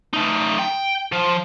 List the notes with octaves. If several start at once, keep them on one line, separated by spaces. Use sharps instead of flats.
A3 D#4
G5
F3